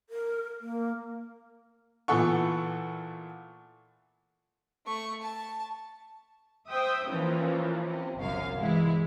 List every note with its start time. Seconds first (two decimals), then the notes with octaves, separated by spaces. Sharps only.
0.10 A#4
0.61 A#3
2.08 A#2 E3 B3 A4 F#5 C#6
4.86 A3 C#6
5.22 A5
6.69 C5 E5 G5 D#6
7.07 A#2 E3 F3 C#4
7.85 C3
8.17 G1 C2 F#2 F3 F5
8.59 C3 E3 G#3 E4